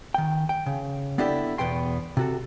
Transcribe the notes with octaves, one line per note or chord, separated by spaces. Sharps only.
D#3 G5
G5
C#3
B3 D4 E4 G4 A4
E2 B2 B3 G5 C6
C3 F#4 A4